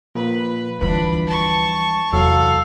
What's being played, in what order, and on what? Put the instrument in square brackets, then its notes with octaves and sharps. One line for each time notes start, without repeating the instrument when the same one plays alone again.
[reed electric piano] A#2 F3 A#3 [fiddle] B4
[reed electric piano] D2 F3 B4 [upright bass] E3 G3 [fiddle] D4 B5
[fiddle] A5 C#6
[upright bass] E2 [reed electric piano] C3 F#3 [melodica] A4 [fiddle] F5